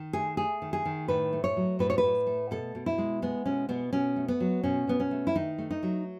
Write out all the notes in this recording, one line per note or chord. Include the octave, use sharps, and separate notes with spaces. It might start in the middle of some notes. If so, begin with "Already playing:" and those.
Already playing: D#3
A3 G#4
A3 G#4
D#3
G#4
D#3
A2 B4
A3
C#5
F#3
A2 B4
C#5
B4
A2
A3
B2 A4
B2
E4
G#3
G#3 B3
B2 C#4
B2 B3
B2 C#4
A3
B3
F#3
B2 C#4
B2 B3
C#4
A3
E4
D#3 D#4
A3
D#4
F#3